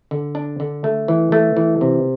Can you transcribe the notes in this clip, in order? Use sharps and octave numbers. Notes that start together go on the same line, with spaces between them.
D3
D4
D3
A3
E3
A3
E3
C3